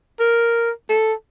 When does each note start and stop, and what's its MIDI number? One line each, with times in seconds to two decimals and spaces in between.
0.20 0.71 70
0.90 1.14 69